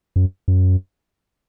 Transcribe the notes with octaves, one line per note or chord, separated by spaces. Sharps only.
F#2
F#2